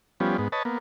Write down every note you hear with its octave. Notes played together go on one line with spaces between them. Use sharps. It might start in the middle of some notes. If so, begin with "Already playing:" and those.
F3 G3 B3 C#4
G#2 B3
B4 C#5 D#5 A5
A#3 B3